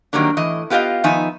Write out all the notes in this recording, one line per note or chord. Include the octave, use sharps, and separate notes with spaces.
D#3 F#3 G3 A#3 D4
A2 E3 D#5
B3 F4 G4 C#5 D#5 F5
D#3 F3 B3 D#4 E5 G#5